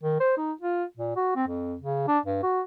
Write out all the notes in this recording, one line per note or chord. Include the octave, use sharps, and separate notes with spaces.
D#3
C5
D#4
F4
A#2
F#4
C4
F2
C#3
D4
G2
F#4